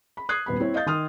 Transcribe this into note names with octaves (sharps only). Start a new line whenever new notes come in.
B5
D#6 F#6 G#6 C7
D#1 B3 B5
C4 E4 C#5
D#5 F5 D#6 G6 A6
D#3 C6 D#6 F6